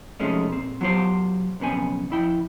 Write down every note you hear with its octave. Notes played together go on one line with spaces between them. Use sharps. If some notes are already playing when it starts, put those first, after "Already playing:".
C3 F3 G#3 A3 C#4 D#4
A#2 C4
F#3 B3 F4 G4 C5
B1 F2 C#3 B3 C4 G#5
F2 E4 G5